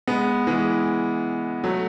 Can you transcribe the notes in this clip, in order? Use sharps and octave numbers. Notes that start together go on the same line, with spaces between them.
G#3 B3
E3 G#3
F#3 A3